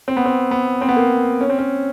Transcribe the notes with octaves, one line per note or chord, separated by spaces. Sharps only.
C4
B3
C4
B3
C4
B3
A#3
C#4
C4
C#4